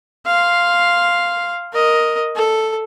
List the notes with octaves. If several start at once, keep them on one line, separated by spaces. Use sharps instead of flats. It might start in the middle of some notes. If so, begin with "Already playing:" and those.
F5 C6
A#4 D#5
A4